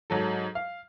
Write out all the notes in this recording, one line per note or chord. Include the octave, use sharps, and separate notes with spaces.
G#2 F#3 A4
F5